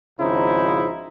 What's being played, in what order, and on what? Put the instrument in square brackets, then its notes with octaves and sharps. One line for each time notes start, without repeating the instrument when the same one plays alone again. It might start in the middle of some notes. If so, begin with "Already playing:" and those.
[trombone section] G#1 C#3 F3 D#4 E4 C5